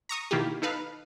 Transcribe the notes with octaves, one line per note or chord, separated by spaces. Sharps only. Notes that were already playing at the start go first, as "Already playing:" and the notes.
A#5 C#6 D#6
B2 D#3 A#3 E4 F4 G4
D#4 A4 B4 F5